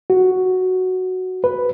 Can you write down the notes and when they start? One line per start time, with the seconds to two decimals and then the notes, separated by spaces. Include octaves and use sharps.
0.10 F#4
1.44 B4